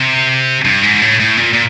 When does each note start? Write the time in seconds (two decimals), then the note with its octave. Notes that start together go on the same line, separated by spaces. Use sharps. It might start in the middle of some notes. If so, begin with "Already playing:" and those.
Already playing: C3
0.65 G2
0.83 G#2
1.02 A2
1.20 A2
1.37 A#2
1.53 A#2